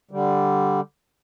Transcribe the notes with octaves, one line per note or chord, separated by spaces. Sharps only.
D3 G3